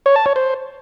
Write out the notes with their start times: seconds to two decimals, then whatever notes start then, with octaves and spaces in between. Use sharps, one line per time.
0.06 C#5
0.16 A5
0.26 C#5
0.36 C5